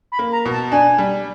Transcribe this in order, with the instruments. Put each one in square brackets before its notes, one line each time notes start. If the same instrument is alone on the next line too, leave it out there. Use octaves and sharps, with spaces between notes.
[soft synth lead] B5
[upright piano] A#3
[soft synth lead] A#5
[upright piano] B2
[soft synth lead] A5
[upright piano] D4 [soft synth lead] G#5
[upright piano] G3